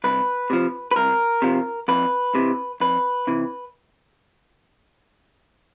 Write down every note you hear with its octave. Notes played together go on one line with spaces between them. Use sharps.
C2 B4
C3 F3
B4
C2 A#4
C3 F3
F2 B4
C3 E3
F2 B4
C3 E3